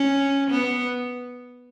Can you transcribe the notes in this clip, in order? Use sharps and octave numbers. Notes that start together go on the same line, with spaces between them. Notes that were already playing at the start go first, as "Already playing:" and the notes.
Already playing: C#4
B3